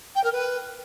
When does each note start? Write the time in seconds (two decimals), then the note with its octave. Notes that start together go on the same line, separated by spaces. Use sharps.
0.15 G5
0.23 A#4
0.32 B4